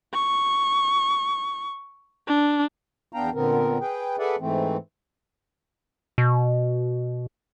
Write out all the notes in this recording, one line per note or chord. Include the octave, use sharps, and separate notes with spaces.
C#6
D4
E2 B3 D4 F5 G5 A#5
A#2 D3 B3 C4 A#4
G#4 B4 G5
G#4 A4 B4 D5 E5 F#5
G#2 E3 A3 C4
B2